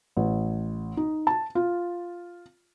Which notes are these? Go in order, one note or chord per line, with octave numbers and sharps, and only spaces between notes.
A1
D#4
A5
F4